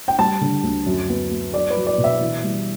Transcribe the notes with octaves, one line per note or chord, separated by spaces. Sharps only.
G5
G3 A5
D3
D2
F#2
B3
B3
F#3 D5
B4
F#3
D5
B2
E5
E3
G3